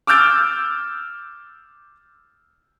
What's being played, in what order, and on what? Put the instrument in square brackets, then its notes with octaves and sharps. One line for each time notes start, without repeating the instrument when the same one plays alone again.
[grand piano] D6 E6 F6 G6 A6 D7